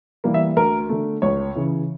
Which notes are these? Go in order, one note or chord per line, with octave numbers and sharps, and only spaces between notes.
E3 G3 A#3
E5
D2 A#4
D3 A3
C#2 C#5
C#3 E3